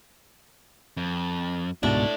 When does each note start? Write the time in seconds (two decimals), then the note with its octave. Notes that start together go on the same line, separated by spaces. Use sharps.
0.97 F2
1.83 C#2 G#2 B2 D4 E4 A4